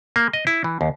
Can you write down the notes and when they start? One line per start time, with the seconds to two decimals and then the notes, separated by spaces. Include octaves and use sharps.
0.16 A#3
0.33 D#5
0.47 E4
0.64 E3
0.81 D#2